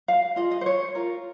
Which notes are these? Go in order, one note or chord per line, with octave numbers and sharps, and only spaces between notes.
F5
F4 G#4 D#5
D#5
C5
C#5
F4 A#4